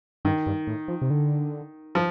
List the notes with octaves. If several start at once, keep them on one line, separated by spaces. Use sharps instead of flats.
G2 D#3
G2
A2
F3
C3
D3
F3